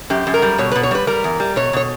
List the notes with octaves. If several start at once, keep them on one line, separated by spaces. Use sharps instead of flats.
F#2 G4
F#2
A#4
G3
B2 C#5
B2 B4
C#5
G3 B4
G3 A#4
E2
G3
B2 C#5
B2 C#5